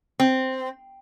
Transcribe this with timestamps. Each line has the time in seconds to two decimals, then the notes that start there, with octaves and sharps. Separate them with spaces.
0.20 C4